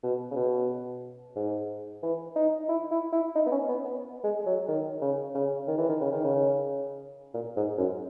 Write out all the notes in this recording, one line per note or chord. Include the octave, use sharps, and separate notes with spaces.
B2
C#3
B2
G#2
E3
D#4
E4
E4
E4
D#4
B3
C#4
B3
B3
G#3
G#3
F#3
D#3
C#3
C#3
D#3
E3
D#3
C#3
D#3
C#3
A#2
G#2
F#2